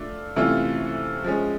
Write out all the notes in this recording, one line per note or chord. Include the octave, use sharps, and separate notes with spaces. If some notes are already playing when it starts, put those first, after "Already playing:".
Already playing: A3 D4 F4
C3 E3 A3 C#4 F4
F3 G#3 C#4